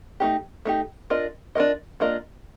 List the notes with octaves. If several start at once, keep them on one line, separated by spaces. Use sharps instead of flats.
A3 D#4 G4
A3 D#4 G4
D4 F4 A#4 D#5
D4 F4 A#4 D#5
A#3 D4 F4 A#4 D#5